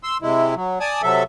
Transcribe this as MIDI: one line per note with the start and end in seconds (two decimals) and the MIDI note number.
0.03 0.17 84
0.03 0.17 88
0.22 0.55 48
0.22 0.55 56
0.22 0.55 64
0.55 0.79 54
0.80 1.02 74
0.80 1.02 80
0.80 1.02 81
0.80 1.02 87
1.02 1.23 48
1.02 1.23 54
1.02 1.23 69
1.02 1.23 76